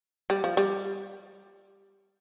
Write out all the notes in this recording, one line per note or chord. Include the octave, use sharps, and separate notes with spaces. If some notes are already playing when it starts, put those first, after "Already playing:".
G3
F3
G3